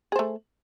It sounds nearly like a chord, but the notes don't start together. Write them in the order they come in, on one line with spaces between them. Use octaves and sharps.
G#4 C5 A3